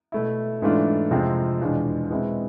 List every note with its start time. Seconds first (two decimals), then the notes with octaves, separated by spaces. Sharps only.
0.12 B2 A3 E4
0.62 G#2 E3 A3 D4 F4
1.11 F2 C3 G#3 C4 F4
1.61 E2 B2 G#3 D4 F4
2.10 B2 G#3 C4 E4